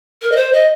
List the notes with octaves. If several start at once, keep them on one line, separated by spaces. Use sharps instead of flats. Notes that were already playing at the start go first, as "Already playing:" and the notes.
A#4
D#5
C5
D#5